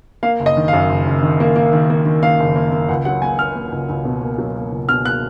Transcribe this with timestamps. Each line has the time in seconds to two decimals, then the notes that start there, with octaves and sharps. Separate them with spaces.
0.23 A#3 F5
0.40 F#1
0.46 D#5
0.57 D#3
0.68 F#2 F5
0.90 F#1
1.06 F#1
1.23 D#3
1.40 A#3
1.56 A#3
1.73 D#3
1.90 A#3
2.06 D#3
2.22 A#3 F5
2.40 F#1
2.55 A#3
2.72 A#3
2.89 C#2 F#5
3.05 F#3 F#5
3.22 A#3 G#5
3.39 A#3 F6
3.55 A#3
3.72 C#2
3.89 C#2
4.05 B2
4.21 A#3
4.38 F#3
4.55 A#3
4.72 C#2
4.89 B2 F6
5.05 A#3 F#6